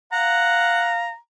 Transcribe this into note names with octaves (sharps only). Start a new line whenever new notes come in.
F5 F#5 A#5